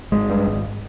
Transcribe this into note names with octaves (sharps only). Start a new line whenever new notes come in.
G#1 G#3
G2
G#1